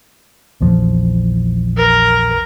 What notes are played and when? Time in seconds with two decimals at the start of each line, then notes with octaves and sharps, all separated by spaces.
0.61 A#1 E2 F3
1.77 A#4